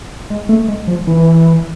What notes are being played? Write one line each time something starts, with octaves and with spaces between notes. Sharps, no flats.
G#3
A3
G#3
F3
E3